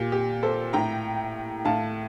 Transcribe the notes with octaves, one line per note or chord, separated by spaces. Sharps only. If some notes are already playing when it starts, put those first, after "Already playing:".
Already playing: A#2 G4
G4
A4 C5
A2 G5 A#5
A2 F5 A5